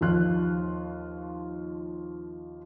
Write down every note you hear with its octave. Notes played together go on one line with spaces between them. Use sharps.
D#2 F3 F4 F#6